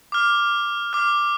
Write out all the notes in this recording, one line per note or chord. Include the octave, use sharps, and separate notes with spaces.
D6 F6
D6 F6